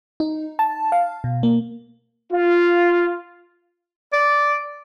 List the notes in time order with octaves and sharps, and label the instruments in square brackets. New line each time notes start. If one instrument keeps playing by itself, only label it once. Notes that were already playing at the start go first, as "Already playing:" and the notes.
[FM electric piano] D#4
A5
F5
B2
A#3
[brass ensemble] F4
[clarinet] D5